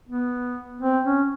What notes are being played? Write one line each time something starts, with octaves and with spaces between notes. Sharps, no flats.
B3
C4
C#4